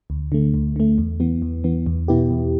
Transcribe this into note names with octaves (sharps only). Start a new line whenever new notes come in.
D2
D3 A3
D2
D3 A3
E2
E3 B3
E2
E3 B3
E2
B2 B3 E4 G4
E2